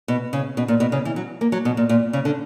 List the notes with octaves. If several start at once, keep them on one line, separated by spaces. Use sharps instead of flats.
B2
C#3
B2
A#2
B2
C#3
E3
F#3
A#3
F#3
B2
A#2
A#2
C#3
D3